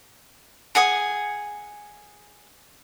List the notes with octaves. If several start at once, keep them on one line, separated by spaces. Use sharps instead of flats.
G#4 F#5 G#5 D#6